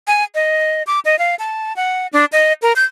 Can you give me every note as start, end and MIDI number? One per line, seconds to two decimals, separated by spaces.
0.07 0.24 80
0.35 0.83 75
0.87 0.99 86
1.05 1.18 75
1.19 1.35 77
1.39 1.75 81
1.76 2.07 78
2.13 2.25 62
2.32 2.53 75
2.62 2.73 70
2.76 2.85 91